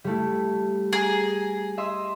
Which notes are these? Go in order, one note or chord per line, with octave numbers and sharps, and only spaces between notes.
G3 A3 E4
G#4 A#5
D#5 E5 C6